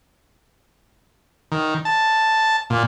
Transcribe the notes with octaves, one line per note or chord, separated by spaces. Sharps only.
D#3
A5
A#2